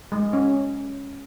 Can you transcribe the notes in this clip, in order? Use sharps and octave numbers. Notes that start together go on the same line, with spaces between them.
G#3
C#4